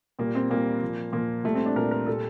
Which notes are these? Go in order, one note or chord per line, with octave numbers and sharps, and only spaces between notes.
A#2 G3 A#3
C4
A#2 G3 A#3
A#2 F3
A#2 F3 A#3
A#2 G3 A3
C4
D4
A#2 G3 A#4
A#4
A#2 G3 A4